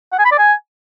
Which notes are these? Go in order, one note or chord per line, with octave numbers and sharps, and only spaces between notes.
F#5
G#5
B5
D5
G#5